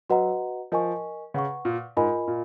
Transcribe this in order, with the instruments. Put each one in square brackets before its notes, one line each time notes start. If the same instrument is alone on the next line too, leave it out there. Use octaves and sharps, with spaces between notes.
[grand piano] F#3 [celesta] F#4 B4 D#5 F#5 A#5
[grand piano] F3 [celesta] A#4 D#5 G#5 C#6
[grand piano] C#3 [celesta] B4 F#5 C#6
[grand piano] A#2
[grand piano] G#2 [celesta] F4 A#4 D#5 G#5 B5
[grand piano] A#2